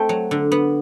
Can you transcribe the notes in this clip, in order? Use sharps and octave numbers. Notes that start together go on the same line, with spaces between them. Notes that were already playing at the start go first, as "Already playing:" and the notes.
Already playing: A3 C4 G5
F#3
D3
B3